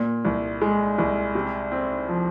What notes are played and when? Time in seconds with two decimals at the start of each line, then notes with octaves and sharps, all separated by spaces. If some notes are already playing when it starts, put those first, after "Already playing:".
Already playing: A#2
0.25 C2
0.62 G#3
0.98 C2
1.35 C3
1.72 C4
2.08 F3